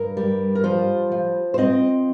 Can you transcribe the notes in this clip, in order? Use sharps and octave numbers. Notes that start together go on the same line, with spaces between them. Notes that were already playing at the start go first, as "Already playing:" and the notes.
Already playing: G2 A#4
G3
A#4
F3 C5
F3
C5
C4 D#5